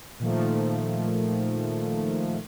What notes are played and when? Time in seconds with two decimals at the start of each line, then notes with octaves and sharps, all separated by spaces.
0.20 A#2 D#3 F3 A3